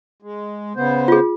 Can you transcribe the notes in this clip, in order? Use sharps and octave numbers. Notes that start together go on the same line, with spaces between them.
G#3
C#3 B3 C5
F4 G#4